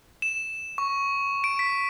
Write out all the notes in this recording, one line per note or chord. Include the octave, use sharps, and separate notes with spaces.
E7
C#6
D7
B6